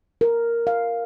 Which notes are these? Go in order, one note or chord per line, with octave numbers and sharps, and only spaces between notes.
A#4
F5